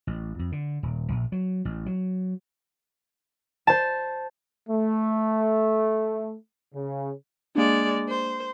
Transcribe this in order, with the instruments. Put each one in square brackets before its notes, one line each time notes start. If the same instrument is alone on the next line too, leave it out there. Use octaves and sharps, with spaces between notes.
[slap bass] A1
F2
D3
D#1
A#1
F#3
A1
F#3
[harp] C5 A5
[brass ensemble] A3
C#3
[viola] G#3 D5 [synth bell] A#3 D4
[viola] C5